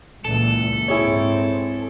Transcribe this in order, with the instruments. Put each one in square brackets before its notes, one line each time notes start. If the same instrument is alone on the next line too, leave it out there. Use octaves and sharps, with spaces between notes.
[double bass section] C#2 A#2 E3 [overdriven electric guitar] A4
[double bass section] G#2 C4 [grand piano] E4 G#4 C#5